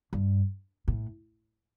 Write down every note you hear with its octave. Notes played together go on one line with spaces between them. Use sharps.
G2
A2